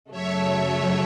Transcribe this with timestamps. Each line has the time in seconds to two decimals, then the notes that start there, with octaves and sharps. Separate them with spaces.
0.11 F#2 C#3 F#3 A3 C#5 E5